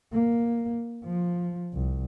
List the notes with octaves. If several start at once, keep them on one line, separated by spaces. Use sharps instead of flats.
A#3
F3
C2